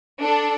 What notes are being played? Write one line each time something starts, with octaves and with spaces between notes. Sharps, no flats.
D4 A4